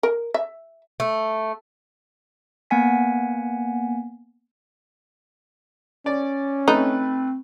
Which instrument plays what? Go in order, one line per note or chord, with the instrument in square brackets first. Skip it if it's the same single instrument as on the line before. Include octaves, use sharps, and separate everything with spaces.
[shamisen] A#4
E5
[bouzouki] A3
[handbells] A#3 B3 F#5 G#5 B6
[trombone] C#4 [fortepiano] D5
[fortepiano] A3 B4 [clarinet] C4 [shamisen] D#4